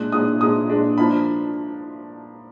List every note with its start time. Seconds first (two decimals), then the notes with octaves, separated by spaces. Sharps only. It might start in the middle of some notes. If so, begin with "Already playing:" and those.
Already playing: A#2 G#3 D4 F#6
0.12 A#2 G#3 D4 D#6
0.41 A#2 G#3 D4 D#6
0.70 A#2 G#3 D4
0.98 F3 A#3 D4 B5